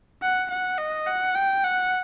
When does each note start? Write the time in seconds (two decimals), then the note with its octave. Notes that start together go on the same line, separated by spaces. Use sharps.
0.22 F#5
0.51 F#5
0.78 D#5
1.07 F#5
1.35 G5
1.64 F#5